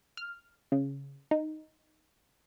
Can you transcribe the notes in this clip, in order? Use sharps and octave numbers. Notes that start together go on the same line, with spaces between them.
F6
C#3
D#4